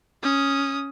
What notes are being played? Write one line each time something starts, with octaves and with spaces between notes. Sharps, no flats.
C#4 D#6